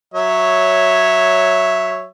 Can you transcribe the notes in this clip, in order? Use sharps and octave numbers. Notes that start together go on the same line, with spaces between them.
F#3 C#5 E5